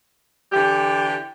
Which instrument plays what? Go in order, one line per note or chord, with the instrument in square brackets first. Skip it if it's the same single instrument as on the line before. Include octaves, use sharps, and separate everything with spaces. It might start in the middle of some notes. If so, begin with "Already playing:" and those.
[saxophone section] D3 E3 G4